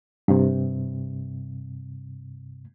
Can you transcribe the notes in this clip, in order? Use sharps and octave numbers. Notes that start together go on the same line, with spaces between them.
G2 C3